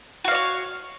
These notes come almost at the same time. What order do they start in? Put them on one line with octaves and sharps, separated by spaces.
F#4 F5 D5 C#5